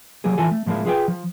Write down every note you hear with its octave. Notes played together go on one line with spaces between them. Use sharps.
F3 F#3 A#3 G4 G#4
E3 F3 E4 F4 A4 G#5
A3
A2 F3 G#3 A#3 E4
F4 G#4 B4 E5 G5
F3